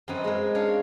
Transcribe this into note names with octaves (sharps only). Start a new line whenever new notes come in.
F#2 C4 D#4 B4
G#3 A#4
C4 D4 C#5 F5